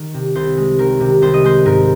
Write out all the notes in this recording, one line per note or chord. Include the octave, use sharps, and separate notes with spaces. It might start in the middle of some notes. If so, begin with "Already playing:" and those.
Already playing: D#3
C3
C2 C5
G#3
D#3 A#4
C3
C2 C5
D#5
G#3 C5
G#2 A#4